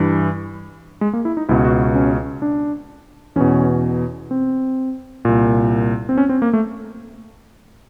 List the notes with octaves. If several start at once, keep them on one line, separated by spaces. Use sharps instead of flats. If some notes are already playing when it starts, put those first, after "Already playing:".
Already playing: G2 E3
G#3
A#3
E4
D#4
C#2 B2 E4
F#4
C#4
D4
E2 B2 C#4
C4
C2 A#2
C4
C#4
C4
A#3
A3